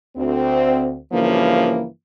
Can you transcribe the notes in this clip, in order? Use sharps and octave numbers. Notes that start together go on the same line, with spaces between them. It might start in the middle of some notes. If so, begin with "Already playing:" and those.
D2 C4
G2 C#3 E3 F3 A#3